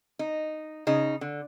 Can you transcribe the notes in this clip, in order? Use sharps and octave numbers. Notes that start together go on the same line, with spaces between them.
D#4
C#3 D#4
D3